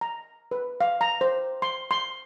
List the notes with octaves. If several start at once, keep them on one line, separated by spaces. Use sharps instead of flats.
A#5
B4
F5
A#5
C5
C6
C6